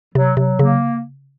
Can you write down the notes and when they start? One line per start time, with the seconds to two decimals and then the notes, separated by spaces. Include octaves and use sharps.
0.15 C3 F#3
0.37 C3 F#3
0.59 C#3 A#3